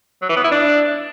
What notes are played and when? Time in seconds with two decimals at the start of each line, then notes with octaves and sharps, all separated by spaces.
0.22 F#3
0.29 E3
0.37 B3
0.44 E4
0.52 D4